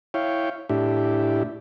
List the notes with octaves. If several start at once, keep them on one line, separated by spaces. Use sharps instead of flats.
E4 C#5 F5 G5
A2 D4 E4 G4